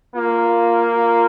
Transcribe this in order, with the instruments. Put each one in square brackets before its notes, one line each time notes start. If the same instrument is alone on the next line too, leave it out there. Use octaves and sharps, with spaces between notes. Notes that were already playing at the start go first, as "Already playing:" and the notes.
[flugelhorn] A#3 [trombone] F4
[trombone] F4